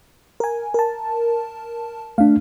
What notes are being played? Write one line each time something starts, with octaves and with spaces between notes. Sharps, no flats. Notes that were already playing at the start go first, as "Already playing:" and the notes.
A#4 G#5
A#4 A5
A3 D4 F5